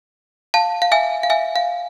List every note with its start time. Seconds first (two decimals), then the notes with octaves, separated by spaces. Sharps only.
0.54 F5 A5
0.82 F5
0.92 E5 G#5
1.23 F5
1.30 E5 G#5
1.56 F5